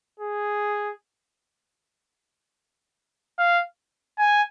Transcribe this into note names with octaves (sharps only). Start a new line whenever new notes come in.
G#4
F5
G#5